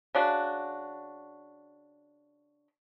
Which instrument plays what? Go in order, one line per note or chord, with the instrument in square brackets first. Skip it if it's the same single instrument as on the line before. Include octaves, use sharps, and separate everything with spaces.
[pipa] C#3 D4 F#4